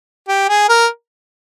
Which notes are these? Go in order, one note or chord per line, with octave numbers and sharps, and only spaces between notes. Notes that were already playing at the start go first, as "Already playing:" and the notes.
G4
G#4
A#4